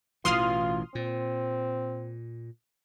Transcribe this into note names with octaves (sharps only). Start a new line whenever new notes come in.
A1 B2 E3 F4 C6 D#6 F6
A#2 C4